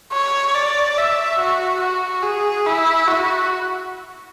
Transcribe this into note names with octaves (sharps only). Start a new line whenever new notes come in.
C#5
D5
E5
F#4
F#4
G#4
E4
F#4